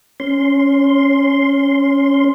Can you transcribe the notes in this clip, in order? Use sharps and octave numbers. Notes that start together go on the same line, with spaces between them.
C#4 C6